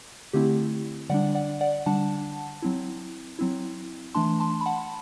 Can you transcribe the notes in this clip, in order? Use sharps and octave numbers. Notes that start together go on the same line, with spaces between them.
D3 A3 C4 E4 G4
D3 G3 D4 D5 F#5
D5 F#5
D5 F#5
D3 G3 D4 F#5 A5
F#3 C4 E4
F#3 C4 E4
E3 A3 D4 A5 C6
A5 C6
B5
F#5 A5